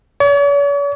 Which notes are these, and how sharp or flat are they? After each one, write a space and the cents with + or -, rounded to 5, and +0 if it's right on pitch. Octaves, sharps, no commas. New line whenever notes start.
C#5 +45